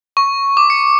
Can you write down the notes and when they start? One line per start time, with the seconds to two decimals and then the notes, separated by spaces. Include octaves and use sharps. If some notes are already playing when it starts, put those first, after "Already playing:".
0.17 C#6
0.57 D6
0.70 C#7